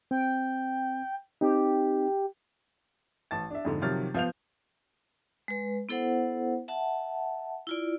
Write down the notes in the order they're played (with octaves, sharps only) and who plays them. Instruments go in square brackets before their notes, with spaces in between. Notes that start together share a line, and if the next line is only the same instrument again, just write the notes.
[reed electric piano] C4 [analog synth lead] G5
[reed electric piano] C4 D#4 [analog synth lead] G4
[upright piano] A1 A5 A6
D4 E5
F2 G#2 D3
C3 D#3 F3 F#3 F6 A6
F3 B3 F5 G6 F7
[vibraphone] G#3 B4
B3 E4 A4 C5 F#5
E5 F#5 A5
E4 F4 D5